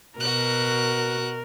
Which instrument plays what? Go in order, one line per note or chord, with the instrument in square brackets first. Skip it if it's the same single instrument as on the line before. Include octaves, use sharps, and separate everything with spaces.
[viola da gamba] B2 [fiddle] F#4 F#6 [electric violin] A#4